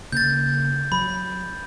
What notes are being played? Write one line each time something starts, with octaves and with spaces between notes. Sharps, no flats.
C#3 A#3 G6 A6
F#3 B5